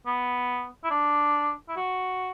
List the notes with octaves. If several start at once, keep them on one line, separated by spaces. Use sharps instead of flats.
B3
E4
D4
E4
F#4